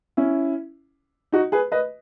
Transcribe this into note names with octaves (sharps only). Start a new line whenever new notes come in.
C#4 E4
D#4 F#4
G#4 B4
B4 D#5